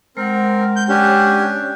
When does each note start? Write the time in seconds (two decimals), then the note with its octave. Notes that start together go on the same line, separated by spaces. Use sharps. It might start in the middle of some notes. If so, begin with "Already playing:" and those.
0.17 G#3 C4 A#4 F#5
0.76 G6
0.89 C#4 D4 G4